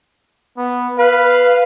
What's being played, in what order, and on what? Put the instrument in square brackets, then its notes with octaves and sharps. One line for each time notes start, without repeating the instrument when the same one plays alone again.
[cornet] B3
[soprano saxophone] B4 [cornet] F5